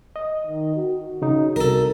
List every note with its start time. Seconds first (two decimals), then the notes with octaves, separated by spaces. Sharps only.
0.16 D#5
0.47 D#3
0.76 F#4
1.22 C#3 D#4
1.56 C2 A4 A#4